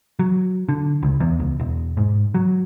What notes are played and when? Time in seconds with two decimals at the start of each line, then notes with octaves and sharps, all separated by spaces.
0.19 F#3
0.69 D3
1.03 C#2
1.20 E2
1.40 C#2
1.59 E1
1.97 G#2
2.34 F#3